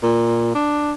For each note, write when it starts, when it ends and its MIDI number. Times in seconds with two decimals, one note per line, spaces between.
0.03 0.50 46
0.54 0.94 62